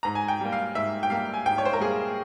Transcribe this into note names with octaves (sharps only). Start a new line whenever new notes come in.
G#2 A#5
G#5
G5
G3 A#3
F5
G#2 E5
G5
G3 A#3 F5
G#5
G#2 G5
C#5
C5
A#4
G3 A#3 G#4